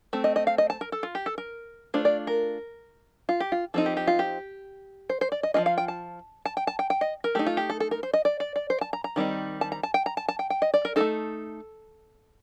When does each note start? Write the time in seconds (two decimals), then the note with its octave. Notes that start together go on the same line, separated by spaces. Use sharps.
0.13 A3 C4
0.24 D#5
0.36 D#5
0.47 F5
0.58 D#5
0.70 A5
0.81 A#4
0.92 A4
1.03 F4
1.15 G4
1.26 A4
1.38 A#4
1.94 A3 D4 F4 C5
2.05 D5
2.27 A#4
3.29 F4
3.40 G4
3.52 F4
3.74 F3 C4 D#4 A4
3.86 G4
3.97 G4
4.07 F4
4.19 G4
5.09 C5
5.21 C5
5.32 D5
5.43 D#5
5.54 F3 C4 F4 D#5
5.66 F5
5.78 G5
5.88 A5
6.46 A5
6.57 G5
6.67 A5
6.79 G5
6.90 G5
7.01 D#5
7.24 A#4
7.35 A3 D#4 G4
7.47 F4
7.57 G4
7.70 A4
7.80 A4
7.91 A#4
8.03 C5
8.14 D#5
8.25 D5
8.40 D5
8.56 D5
8.70 C5
8.81 A5
8.93 A#5
9.04 A#5
9.16 D#3 G3 C4 D#4
9.61 A5
9.72 A#5
9.83 A5
9.94 G5
10.06 A#5
10.17 A5
10.28 A5
10.39 G5
10.50 G5
10.62 D#5
10.74 D5
10.85 A#4
10.96 A3 C4 D#4 A4